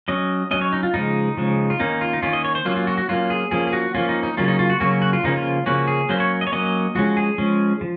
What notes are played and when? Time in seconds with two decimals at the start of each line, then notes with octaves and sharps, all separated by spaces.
0.08 F#3 C#4 D#5
0.51 F#3 C#4 D#5
0.61 C#5
0.72 D#4
0.83 F4
0.94 C#3 F3 G#3 D#4
1.37 C#3 F3 G#3
1.70 F4
1.80 D#3 A#3 C#4 D#4
2.01 F4
2.13 D#4
2.23 D#3 A#3 C#4 F4
2.33 D#5
2.45 C#5
2.55 C5
2.65 F#3 A#3 C#4 F4
2.76 F4
2.87 F#4
2.98 F#4
3.09 F#3 A#3 C#4 F4
3.30 G#4
3.51 F3 A#3 C#4 G#4
3.67 G#4
3.73 F#4
3.95 F3 A#3 C#4 F4
4.09 D#4
4.23 D#4
4.37 C#3 F#3 A#3 C#4 F4
4.48 D#4
4.59 F4
4.70 F#4
4.80 C#3 F#3 A#3 C#4 F#4
5.02 F#4
5.13 F4
5.23 C#3 F3 A#3 C#4 D#4
5.36 F4
5.66 C#3 F3 A#3 C#4 F#4
5.87 G#4
6.09 F#3 A#3 C#4 C5
6.20 C#5
6.41 D#5
6.47 C#5
6.52 F#3 A#3 C#4 D#5
6.95 F3 G#3 C#4 F#4
7.17 G#4
7.38 F3 G#3 C#4
7.81 F3